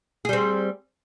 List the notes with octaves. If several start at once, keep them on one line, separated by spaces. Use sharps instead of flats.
G3 C4 G#4